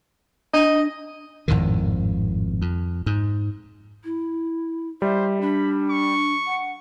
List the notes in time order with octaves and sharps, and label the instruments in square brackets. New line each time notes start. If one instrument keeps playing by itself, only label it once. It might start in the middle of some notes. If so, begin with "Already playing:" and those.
[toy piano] D4 [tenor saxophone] D#5
[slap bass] G#1 F2 A2 D#3
F2
G#2
[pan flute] E4
[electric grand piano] G3 [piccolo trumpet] C5 [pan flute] E5
[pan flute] D4 [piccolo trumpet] B5
[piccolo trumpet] C#6
[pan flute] F#5